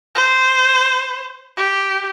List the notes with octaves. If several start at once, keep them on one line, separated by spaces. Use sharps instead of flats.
C5
G4